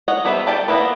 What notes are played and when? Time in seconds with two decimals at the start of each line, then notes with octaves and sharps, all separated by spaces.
0.08 C#5 D#5 F#5
0.25 G3 B3 B4 C5 E5
0.47 A4 D5 G5 A5
0.68 A#3 B3 C#4 E4 B4